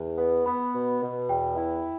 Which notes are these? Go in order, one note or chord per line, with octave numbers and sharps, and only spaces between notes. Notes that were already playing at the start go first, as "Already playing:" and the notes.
Already playing: E2
B3
B3 B5
B2
B2
E2 G5
E4